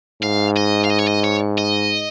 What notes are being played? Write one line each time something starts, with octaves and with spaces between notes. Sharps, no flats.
G#2 F5
D#5
F5
D#5
C#5
D#5
C#5
D#5